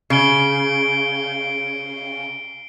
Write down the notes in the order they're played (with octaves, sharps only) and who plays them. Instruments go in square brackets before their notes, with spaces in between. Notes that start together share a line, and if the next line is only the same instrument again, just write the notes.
[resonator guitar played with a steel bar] C#3 [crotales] C7 D7 G7